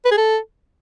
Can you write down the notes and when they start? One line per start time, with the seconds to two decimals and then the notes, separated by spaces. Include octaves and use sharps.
0.05 B4
0.11 G#4
0.18 A4